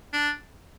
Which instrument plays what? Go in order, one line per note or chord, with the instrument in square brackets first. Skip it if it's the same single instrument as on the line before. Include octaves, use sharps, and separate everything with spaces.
[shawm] D4